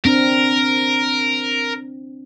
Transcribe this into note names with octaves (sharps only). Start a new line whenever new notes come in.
C4 D4 A#4